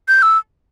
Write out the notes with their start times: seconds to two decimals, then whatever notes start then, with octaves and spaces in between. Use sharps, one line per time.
0.08 G6
0.22 E6